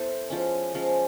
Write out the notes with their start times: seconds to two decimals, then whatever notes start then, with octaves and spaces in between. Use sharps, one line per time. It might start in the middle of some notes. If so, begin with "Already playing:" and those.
Already playing: B3 E4 A4 C5
0.30 F3 G#3 C#4
0.74 F3 G#3 C#4